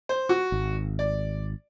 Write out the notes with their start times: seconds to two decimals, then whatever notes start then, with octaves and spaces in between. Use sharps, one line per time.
0.09 C5
0.29 F#4
0.52 G#1
0.99 D5